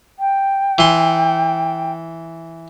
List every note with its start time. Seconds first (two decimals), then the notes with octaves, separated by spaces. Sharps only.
0.19 G5
0.78 E3 C6